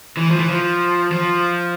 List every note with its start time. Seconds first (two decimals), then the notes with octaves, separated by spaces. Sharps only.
0.17 E3
0.30 F3
0.40 E3
0.49 F3
1.12 F3